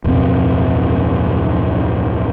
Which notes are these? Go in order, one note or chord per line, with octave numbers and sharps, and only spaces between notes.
D1 F2 B2 C4